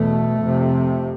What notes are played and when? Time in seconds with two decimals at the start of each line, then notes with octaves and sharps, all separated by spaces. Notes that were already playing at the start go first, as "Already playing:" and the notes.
Already playing: E2 B2 A3
0.40 F2 C3